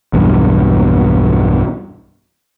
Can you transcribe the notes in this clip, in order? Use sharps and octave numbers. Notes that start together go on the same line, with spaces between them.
B1 E2 G2